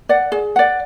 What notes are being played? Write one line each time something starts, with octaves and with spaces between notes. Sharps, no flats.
D5 F#5
G#4
D5 F#5